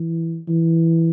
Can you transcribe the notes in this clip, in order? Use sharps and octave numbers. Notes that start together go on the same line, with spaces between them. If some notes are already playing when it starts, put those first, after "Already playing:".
Already playing: E3
E3